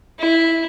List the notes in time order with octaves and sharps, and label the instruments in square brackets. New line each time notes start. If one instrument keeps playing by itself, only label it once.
[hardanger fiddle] E4